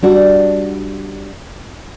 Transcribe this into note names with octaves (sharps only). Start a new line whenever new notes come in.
G3 D4 F#4